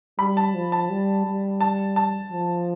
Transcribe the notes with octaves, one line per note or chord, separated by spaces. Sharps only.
G3 B5
A5
F3
A5
G3
G3
A5
A5
F3